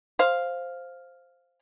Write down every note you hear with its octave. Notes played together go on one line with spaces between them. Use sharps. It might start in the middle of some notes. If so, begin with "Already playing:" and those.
C5 F5